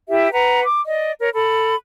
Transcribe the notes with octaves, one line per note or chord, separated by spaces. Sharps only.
E4 G4 E5
B4 F#5 A#5
D6
D5 D#5
A#4 C#5
A4 B5